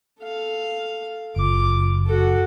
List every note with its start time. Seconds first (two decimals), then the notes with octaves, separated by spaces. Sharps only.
0.20 A4 F5
1.36 F#1 F4 D6
2.06 F#4 A4